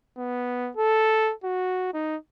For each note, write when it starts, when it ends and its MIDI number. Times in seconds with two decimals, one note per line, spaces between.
0.17 0.70 59
0.77 1.32 69
1.44 1.90 66
1.94 2.16 63